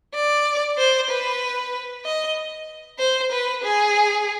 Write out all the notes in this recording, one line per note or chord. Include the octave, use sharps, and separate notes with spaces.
D5
C5
B4
D#5
C5
B4
G#4